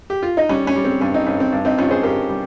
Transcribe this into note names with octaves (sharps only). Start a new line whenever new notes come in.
G4
F4
D#4
G3 C#4
C#4
G3
C4
G2 C#4
C4 D#4
G2 C#4
C4
G2
C4 D#4
G2 C#4 F4
G#4 C5
G2 G4 A#4
G3